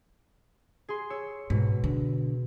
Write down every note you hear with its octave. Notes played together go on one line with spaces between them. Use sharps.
G#4 C6
C#5 E6 C#7
G#2 B2
D3